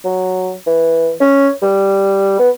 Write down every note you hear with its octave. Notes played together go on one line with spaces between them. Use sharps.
F#3
E3
C#4
G3
B3